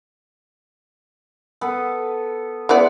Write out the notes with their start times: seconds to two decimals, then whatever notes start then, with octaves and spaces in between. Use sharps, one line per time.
1.61 B3 A4
2.69 G#3 B3 E4 D5 F#5